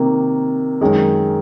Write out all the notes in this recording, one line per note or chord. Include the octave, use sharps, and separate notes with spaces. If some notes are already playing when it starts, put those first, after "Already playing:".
Already playing: C3 D#3 A#3
F#2 D#3 G#3